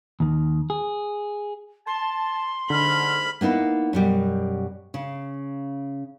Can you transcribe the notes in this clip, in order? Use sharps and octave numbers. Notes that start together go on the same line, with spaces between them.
D#2 D#3
G#4
A5 C6
G#2 D3 B5 F6
A#3 B3 D#4 E4
F#2 B2 G3
C#3